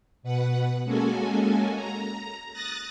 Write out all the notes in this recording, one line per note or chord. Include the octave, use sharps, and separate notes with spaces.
B2 B4 F#5
G#3 A#3 C#4 F#4 A4 G#5
A#5
D#6 F#6 A6 A#6